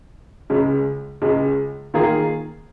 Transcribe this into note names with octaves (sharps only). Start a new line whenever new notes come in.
C#2 C#3 G#3
C#2 C#3 G#3
D#3 A#3 F4 G#4